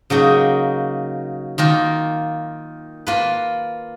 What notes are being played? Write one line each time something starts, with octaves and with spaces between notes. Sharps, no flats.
C#3 F#3 A#3 D#4
D#3 A#3 F4 A#4
A#3 F4 B4